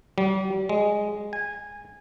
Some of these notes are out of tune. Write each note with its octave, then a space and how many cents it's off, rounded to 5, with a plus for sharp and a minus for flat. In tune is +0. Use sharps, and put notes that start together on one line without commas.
G3 -35
G#3 -5
G#5 -15